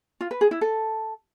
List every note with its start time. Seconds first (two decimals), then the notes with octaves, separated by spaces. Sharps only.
0.21 F4
0.31 B4
0.41 G#4
0.51 E4
0.61 A4